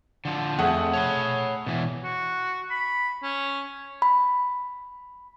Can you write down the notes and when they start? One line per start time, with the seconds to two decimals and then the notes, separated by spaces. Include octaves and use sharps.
0.25 D3 F3
0.59 F2 A3 G#4 F#5
0.93 C#5 B5
1.67 B2 E3
2.04 F#4
2.70 B5
3.23 C#4
4.02 B5